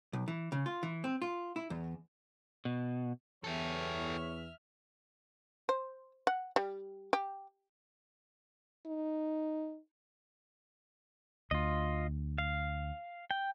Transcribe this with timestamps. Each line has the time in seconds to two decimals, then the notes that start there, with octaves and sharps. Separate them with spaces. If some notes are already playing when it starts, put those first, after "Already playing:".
0.13 B1
0.28 E3
0.52 C#3
0.66 F4
0.83 E3
1.04 C4
1.22 F4
1.56 E4
1.70 E2
2.65 B2
3.44 E2 G4 A4 C#5 E5 F6
5.69 C5
6.27 F#5
6.56 G3
7.13 G4
8.86 D#4
11.51 D2 F4 D#5
12.38 F5
13.31 G5